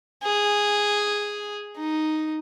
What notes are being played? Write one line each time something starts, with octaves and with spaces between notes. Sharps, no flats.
G#4
D#4